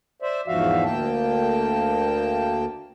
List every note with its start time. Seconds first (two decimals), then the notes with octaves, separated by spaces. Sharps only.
0.22 C5 D5 E5
0.48 E2 G#2 F3 F#4 E5 F5
0.85 D2 A#3 G5 A5